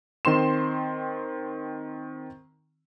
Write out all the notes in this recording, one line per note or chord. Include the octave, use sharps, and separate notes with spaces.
D#3 C4 C6 E7